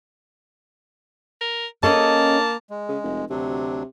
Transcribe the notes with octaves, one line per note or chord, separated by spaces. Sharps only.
A#4
A#3 C#4 A4 D#5 A5
G#3
C#3
F1
D2 C3 F#3 D4